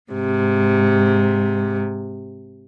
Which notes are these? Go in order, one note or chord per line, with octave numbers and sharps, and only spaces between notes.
G#2 C3